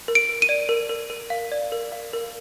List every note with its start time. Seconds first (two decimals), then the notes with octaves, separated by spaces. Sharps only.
0.08 A#4
0.15 D7
0.29 A#4
0.42 D#7
0.49 D5
0.69 A#4
0.89 A#4
1.10 A#4
1.30 F5
1.52 D5
1.72 A#4
1.92 F5
2.13 A#4